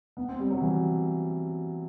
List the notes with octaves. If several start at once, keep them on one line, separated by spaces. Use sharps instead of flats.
B3
C4
G3
F#3
E3